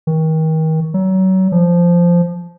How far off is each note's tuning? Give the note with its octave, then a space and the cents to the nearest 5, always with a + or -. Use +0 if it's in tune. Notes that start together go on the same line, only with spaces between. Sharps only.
D#3 +35
F#3 +30
F3 -10